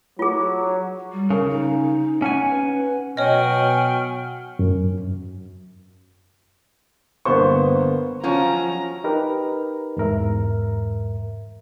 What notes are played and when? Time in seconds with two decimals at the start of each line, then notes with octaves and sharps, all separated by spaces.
0.19 F#3 F4 G#4
1.12 G3
1.30 C#3 A#4
1.49 D#4
2.22 C#4 F#5 G#5
2.50 B4
3.17 B2 F#3 C#5 D#5 G5 G#5 F6
4.59 F#2
7.25 G1 A#3 B3 C5 C#6
8.24 F3 F#3 C#4 A#5
9.04 D#4 G4 A#4 B4
9.97 E2 G#2 A#4 E5